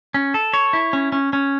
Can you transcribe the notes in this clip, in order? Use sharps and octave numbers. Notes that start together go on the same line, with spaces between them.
C#4
A4
C#5
E4
C#4
C#4
C#4